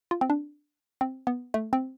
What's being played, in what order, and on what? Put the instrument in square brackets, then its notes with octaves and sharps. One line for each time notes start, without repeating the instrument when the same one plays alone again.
[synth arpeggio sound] F4
C4
D4
C4
B3
A3
C4